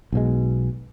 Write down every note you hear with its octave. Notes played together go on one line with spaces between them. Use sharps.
B1 B2 G#3